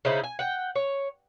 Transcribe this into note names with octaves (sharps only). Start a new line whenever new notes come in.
C#3 D#4 E4 C5
G#5
F#5 G5
C#5